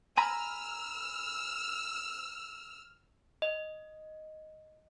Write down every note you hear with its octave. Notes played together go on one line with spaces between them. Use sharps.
G#5 A#5 B5 E6 F6
D#5